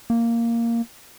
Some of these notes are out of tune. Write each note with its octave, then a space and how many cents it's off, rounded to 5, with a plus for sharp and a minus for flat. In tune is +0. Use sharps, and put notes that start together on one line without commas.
A#3 -5